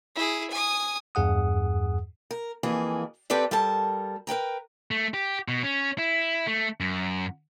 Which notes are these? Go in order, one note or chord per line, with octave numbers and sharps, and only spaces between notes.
E4 G#4
G#5 D#6
E2 G2 G#4 F#5 D#6
A#4
F2 E3 A#3 G#4
C4 G4 A4 B4 D5
G3 A4 A#4 A5
A#4 B4 G5 A#5
A3
G4
B2
C#4
E4
A3
F#2